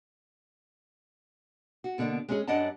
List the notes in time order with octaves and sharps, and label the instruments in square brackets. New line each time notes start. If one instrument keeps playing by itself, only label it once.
[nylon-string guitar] F#4
B2 D3 A#3 D4
G#3 C#4 G#4
F#2 G3 D4 D#5 F#5 A5